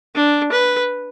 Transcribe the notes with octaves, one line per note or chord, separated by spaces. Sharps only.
D4
B4